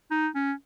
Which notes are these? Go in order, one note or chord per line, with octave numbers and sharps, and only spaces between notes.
D#4
C#4